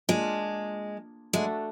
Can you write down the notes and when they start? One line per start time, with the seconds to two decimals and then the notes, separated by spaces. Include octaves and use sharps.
0.09 G#3 A#3 D4 F4
1.33 G#3 A3 D4 F#4 A4